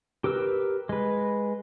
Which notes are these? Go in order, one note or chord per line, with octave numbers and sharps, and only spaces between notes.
G4 A#4 B4 E6
G#3 B4